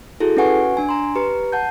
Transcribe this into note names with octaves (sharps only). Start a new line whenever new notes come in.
E4 F#4 G#4 A4
C#4 F#4 B4 F#5 G#5 C#6
D4 G#5
A#5 C6
G4 B4 A#5
F#5 A5 G6